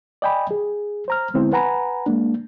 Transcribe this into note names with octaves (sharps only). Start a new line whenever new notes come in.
D5 D#5 G5 G#5 B5
G#4
C5 A#5 F6
D3 G#3 B3 C4 E4 C5
B4 F#5 G#5 A#5 B5
G#3 A#3 D4